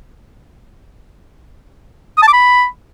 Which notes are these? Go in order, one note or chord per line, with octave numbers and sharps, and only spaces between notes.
D#6
A5
D6
B5